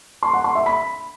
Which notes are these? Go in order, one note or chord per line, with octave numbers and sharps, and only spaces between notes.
C6
F#5
C6
E5
B5